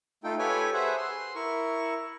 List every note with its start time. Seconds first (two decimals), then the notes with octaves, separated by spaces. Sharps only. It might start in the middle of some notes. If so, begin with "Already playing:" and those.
0.24 A3 D#4 F4 A4 G5
0.39 G4 A4 B4 C#5 G#5
0.73 G#4 B4 C5 E5 F#5
0.97 C6
1.35 E4 A#4 C#6